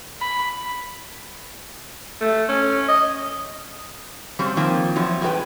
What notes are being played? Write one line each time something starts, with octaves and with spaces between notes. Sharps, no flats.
B5
A3
C#4
D#5
C#3 F#3 G3 C4
D#3 F3 A#3 C4
E2 F3 F#3
G2 C3 G#3 F#4 B4 G5